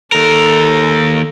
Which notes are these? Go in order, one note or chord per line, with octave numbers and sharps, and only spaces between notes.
D#2 A4 A#4